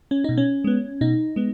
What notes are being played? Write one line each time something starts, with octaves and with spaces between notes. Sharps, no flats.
C#4
B2 D#4
C#4
G#3 B3
B2 D#4
G#3 B3